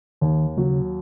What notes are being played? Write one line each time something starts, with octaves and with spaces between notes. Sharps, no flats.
D#2 D#3
C#3 F#3